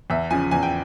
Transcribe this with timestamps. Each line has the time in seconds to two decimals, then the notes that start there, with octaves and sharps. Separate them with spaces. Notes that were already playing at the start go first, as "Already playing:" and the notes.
0.10 E2 E5
0.31 C#3 F3 G#5
0.51 E2 G#5
0.63 G5